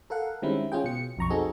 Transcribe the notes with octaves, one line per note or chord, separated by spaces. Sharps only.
A4 A#4 F5 F#5
D#3 G3 G#3 C4 C#4 E4
C#4 F4 G#4 G5
B2 C#7
B1 F2 A#5 C#6
C4 D#4 F#4 G#4 A4